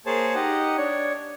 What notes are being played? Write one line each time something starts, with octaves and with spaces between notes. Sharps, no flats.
A#3 G#4 C5 C#5 A5
D#4 G4 D#5 F#5
D4 C#5